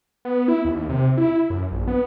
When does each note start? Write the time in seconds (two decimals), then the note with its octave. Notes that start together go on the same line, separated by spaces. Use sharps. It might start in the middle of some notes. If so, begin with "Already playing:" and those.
0.25 B3
0.48 E4
0.65 D#2
0.89 C3
1.18 E4
1.50 F#2
1.72 A#1
1.87 B3